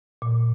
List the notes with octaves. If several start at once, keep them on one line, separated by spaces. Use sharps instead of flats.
A#2